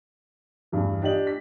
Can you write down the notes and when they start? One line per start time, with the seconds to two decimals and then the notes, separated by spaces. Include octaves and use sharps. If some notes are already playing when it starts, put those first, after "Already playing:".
0.72 E2 G2 E3
1.02 D4 G4 D#5 F#7
1.27 B6